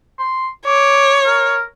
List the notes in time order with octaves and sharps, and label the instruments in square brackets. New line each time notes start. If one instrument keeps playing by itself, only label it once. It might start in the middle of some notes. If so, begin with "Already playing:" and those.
[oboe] C6
[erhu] C#5 [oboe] D6
[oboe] A#4